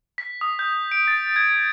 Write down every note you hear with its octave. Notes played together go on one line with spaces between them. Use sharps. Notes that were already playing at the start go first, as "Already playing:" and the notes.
B6
D#6
G6
D7
A6
G#6